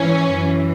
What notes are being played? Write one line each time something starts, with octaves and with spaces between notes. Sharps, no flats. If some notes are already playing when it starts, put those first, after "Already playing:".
Already playing: G#2 E3 C#4
F#2 E3